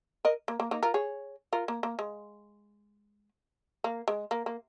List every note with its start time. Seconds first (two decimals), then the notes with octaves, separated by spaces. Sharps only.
0.25 A#4 D#5
0.48 A#3
0.60 A#3
0.71 A#3 D#4
0.83 F4 A#4
0.94 G#4 C#5
1.53 F4 A#4
1.68 A#3
1.83 A#3
1.99 G#3
3.84 A#3
4.08 G#3
4.31 A#3
4.46 A#3